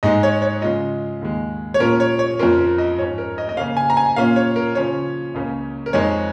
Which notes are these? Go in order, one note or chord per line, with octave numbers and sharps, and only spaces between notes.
G#2 G#3 D#4 D#5
C#5
C#5
C#3 G#3 C#4 F4 D#5
D#2 D#3 G#3
C#5
A#2 F3 C#4 F4 A#4
C#5
C#5
F2 F3 C#4 F4 A#4
A#4
D#5
G#2 F3 C#4 C#5
A#4
D#5
D#5
C#3 A#3 C#4 F5
G#5
A#5
G#5
A#2 A#3 C#4 F4 F5
C#5
A#4
C#3 F3 C#4 F4 C#5
C#2 C#3 A#3 C#4
A#4
F2 F3 G#3 D#4 C#5